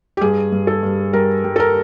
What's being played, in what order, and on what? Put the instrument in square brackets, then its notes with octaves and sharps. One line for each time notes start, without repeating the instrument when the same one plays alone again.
[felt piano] G4
G2 G#4
G2
A4
G2
G3 A#4
G3
A4
A#4